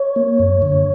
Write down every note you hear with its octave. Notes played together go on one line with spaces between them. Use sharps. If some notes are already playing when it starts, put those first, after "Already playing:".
Already playing: C#5
A#3
F#2
D3